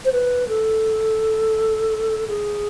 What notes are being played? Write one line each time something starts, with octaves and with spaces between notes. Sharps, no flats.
C5
B4
A4
G#4